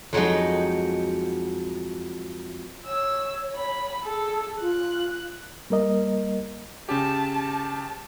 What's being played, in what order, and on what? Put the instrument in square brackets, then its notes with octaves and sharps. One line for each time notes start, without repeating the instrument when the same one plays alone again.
[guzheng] F2 F#3 G#3 D#4
[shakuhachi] C#5 [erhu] E6
[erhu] B5
[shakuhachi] G#4 [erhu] A4
[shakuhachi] F4 [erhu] F#6
[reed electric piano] G3 A#3 A#4 D#5
[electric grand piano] C#3 C#4 G4 [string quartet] A5